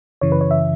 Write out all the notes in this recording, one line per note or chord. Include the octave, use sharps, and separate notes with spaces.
F#2 C#3 E3 C#5
B4
C#5
E5